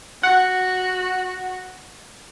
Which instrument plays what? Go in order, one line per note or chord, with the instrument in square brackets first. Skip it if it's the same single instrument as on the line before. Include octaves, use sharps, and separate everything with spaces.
[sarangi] F#4 [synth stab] F#5